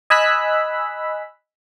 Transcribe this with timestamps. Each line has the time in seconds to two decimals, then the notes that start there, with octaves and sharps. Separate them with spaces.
0.10 D#5 G#5 B5 E6 F#6 B6